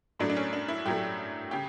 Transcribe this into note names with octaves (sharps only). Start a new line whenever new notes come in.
A2 F#3 A3 D4
D4
C#4
D4
E4
A2 F#3 A3 G4
C#3 G4